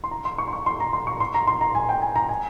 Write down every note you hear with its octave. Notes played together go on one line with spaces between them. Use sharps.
C6
A#5
C6
C#6
C6
C#6
C6
A#5
C6
C#6
C6
A#5
C6
A#5
G#5
G5
G#5
A#5
G#5